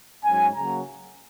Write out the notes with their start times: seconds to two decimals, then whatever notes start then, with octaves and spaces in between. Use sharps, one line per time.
0.24 G#2 F#3 C#4 G#5
0.56 C#3 F#3 A#3 A#5